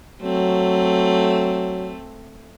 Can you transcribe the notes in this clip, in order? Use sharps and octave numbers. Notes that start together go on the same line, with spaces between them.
F#3 A3 C4